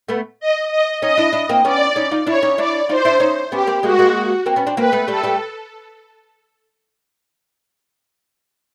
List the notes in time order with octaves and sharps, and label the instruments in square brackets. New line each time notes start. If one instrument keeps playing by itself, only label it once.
[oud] A3 B3
[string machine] D#5
D#5
[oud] C#4 D#4 [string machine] D#5
[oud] D4 E4
D4 E4
A#3 C4
[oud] B3 C#4 [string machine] D5
[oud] C#4 D#4
D#4 F4
[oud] D4 E4 [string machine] C#5
[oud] C#4 D#4
[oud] D4 E4 [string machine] D5
[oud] D#4 F4 [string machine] C5
[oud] D4 E4
C#4 D#4
[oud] B3 C#4 [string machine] G4
[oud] A#3 C4
[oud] G#3 A#3 [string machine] F#4
[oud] G#3 A#3
A#3 C4
B3 C#4
C4 D4
[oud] A#3 C4 [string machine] B4
[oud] A3 B3
[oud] G3 A3 [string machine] A4
[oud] G3 A3